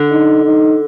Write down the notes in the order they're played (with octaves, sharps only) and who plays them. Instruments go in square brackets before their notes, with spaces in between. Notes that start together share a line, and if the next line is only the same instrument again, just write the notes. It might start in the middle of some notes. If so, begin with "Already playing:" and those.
Already playing: [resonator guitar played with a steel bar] D3
[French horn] D#4
D#4